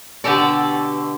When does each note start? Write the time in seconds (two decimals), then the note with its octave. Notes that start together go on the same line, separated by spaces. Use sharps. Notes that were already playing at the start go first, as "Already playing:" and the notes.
0.24 B2 D3 G4 A4 D5